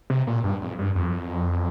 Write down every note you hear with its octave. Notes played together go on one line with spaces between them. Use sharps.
C3
A#2
G2
F2
G2
F2